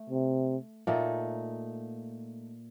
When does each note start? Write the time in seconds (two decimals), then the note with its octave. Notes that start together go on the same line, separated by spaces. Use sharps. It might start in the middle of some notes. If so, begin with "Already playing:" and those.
Already playing: A3
0.10 C3
0.87 A#2 A3 D#4 A4